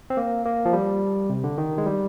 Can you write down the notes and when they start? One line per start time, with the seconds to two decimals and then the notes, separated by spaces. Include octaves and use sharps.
0.10 C4
0.17 A#3
0.46 A#3
0.65 F3
0.73 G3
1.30 C3
1.44 D3
1.58 D#3
1.78 G#3
1.86 G3